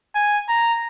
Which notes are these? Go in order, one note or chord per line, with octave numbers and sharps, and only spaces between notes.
G#5
A#5